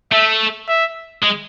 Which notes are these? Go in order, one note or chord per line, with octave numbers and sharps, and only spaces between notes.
A3 E5
E5
G#3